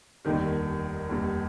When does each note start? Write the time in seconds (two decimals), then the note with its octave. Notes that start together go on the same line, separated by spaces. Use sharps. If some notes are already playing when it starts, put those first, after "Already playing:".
0.25 F1 D#2 D3 D#3 G3
1.09 F1 D#2 D3 G3